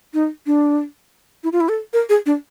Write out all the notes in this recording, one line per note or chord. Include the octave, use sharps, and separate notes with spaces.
D#4
D4
E4
F4
E4
A4
A#4
G#4
D4